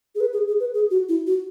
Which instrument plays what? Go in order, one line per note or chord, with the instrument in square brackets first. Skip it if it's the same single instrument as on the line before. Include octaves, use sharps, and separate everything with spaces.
[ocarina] G#4
B4
G#4
G#4
B4
G#4
F#4
E4
F#4